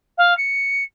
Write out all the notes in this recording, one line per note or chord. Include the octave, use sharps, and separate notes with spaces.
F5
C#7